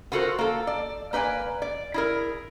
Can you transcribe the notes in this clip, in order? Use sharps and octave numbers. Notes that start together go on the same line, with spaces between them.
B3 F4 F#4 A4 A#4 C5
A#3 A4
D5
A#3 B4 D5 G5 G#5
D5
E4 G#4 A#4